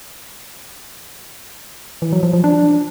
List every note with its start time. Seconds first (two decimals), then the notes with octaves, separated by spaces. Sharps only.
2.02 E3
2.12 F#3
2.23 F3
2.33 F3
2.44 D4